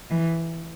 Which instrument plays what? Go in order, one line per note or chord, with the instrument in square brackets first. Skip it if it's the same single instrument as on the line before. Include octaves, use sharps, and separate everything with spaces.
[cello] E3